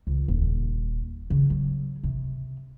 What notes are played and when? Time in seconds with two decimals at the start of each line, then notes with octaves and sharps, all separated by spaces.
0.07 C#2
0.28 D#1
1.30 C#3
1.50 F#3
2.03 C3